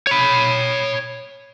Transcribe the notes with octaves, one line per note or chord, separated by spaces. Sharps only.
C#5 B5